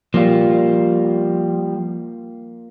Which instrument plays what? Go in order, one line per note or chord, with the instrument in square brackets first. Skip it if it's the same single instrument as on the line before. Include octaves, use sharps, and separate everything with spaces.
[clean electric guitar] F3 G3 [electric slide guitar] A#3 F4